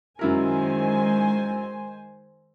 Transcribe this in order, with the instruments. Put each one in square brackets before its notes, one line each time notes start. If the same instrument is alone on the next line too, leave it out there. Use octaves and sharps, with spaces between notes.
[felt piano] F#2 E4 A#4 [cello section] D#3 G#3 [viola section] C5 G#5